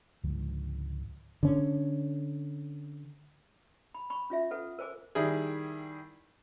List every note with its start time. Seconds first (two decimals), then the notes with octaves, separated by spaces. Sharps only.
0.23 C#2 G#2 D3 F3
1.43 D3 C#4
3.94 B5
4.10 B5 C#6
4.30 C#4 F4 E5
4.51 A4 B4 F#5
4.79 A#4 C5 G#5 D6
5.15 D#3 G3 E4 G#4